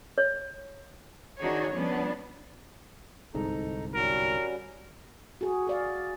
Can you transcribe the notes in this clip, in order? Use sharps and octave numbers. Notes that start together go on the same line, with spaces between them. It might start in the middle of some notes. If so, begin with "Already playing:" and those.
C#5
D#3 D4 D#4 F#4 G#4 C#5
F3 G3 B3 C#4 D4
G1 C2 G#2 D#4 A4 A#5
G3 C#4 F#4 A#4
F#4 G#4
G#4 D5 F5